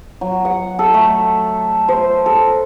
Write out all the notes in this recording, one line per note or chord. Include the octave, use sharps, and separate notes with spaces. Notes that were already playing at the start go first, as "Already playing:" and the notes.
F#3
F#5
A4
A3
C5
A4